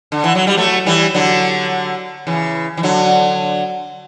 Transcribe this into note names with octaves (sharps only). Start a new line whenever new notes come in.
D3
E3
F#3
G3
F#3 A3
E3 G3
D3 F#3
C#3 E3
E3
D3 F#3